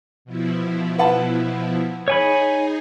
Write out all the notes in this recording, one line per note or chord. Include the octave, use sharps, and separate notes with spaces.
B2 F3 E4
B4 F#5 A5
D#4 G#4 C#5 G#5 B5